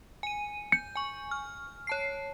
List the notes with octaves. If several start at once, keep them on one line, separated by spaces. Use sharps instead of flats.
G#5 D#7
G6 C#7
G#5 C#6
F6
C#5 A5 C7